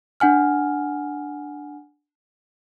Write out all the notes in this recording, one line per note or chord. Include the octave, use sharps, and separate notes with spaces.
D4 F#5 G#5 F6